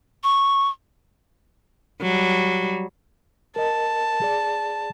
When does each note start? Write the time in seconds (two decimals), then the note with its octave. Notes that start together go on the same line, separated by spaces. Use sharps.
0.23 C#6
2.02 F#3 G3
3.56 A#4 D#5 A5
4.22 G#4 D5